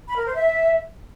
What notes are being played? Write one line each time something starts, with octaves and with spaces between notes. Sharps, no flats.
B5
A#4
C5
E5